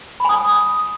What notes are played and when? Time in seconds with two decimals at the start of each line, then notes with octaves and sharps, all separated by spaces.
0.20 B5
0.25 G#5
0.29 D#6